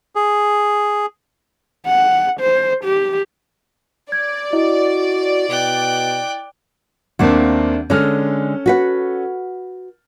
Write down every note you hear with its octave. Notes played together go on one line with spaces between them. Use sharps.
G#4
F#5
C5
G4
D5 G#6
E4 F#4 D#5
B2 G5 F#6
D#2 A3 A#3 C4 D4 F#5
D3 G#3 C#4 A4 F6
F#4 B4 F#5